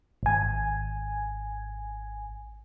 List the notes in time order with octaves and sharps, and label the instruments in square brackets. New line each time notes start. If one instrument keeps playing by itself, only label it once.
[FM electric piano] G#1 G#5